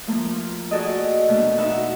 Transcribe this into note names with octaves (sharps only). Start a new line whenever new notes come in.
F3 A3 A#3
F4
F#4 G#4 A4 D5 D#5
B2 A3 A#3 D4
D#4 F#4 B4 E5 F#5